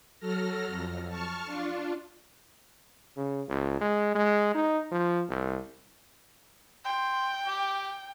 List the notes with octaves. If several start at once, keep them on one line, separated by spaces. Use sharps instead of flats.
F#3 A4 F6 A#6
F2
A5 C#6 F6
D4 F4
C#3
C#2
G#3
G#3
D#4
F3
C2
G5 C6
G4